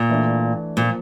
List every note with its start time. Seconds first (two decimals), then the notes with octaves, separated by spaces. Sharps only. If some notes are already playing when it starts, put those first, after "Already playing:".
Already playing: A#2
0.09 E3 A3 D4
0.77 A#2 F3 A#3